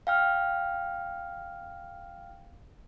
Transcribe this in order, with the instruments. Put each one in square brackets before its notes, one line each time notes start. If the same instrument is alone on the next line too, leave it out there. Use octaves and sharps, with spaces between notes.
[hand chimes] F5 G5 F6